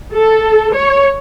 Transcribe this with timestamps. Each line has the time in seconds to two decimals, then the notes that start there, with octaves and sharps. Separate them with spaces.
0.14 A4
0.75 C#5